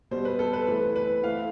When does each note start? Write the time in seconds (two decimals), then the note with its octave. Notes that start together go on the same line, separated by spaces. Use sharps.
0.11 B2 G3 C4 C5
0.25 B4
0.39 A4
0.53 B4
0.67 E3 A3 C4 B4
0.96 B4
1.23 E3 A3 C4 F5